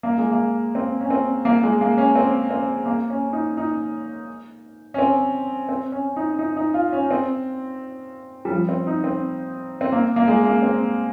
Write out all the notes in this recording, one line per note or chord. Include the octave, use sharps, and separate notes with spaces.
A#3
G#3
A#3
C4
C#4
C4
A#3
G#3
A#3
C#4
C4
C4
A#3
C#4
D#4
D#4
C#4
C4
C4
C#4
D#4
D#4
D#4
F4
C#4
C4
G3
F3
C4
D#4
C4
C4
A#3
A#3
G#3
A#3
C4